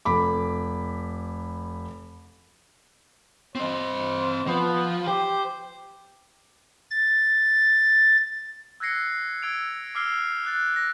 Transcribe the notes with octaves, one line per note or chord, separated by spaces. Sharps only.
F1 B5 D6
C4 C5 D#5
F3 B3
G4 C5
A6
E6 F#6 G#6 A#6 C7 C#7
E6 G#6 D7 F7
D6 E6 F6 C7 G7
F6 F#6 A6
A#6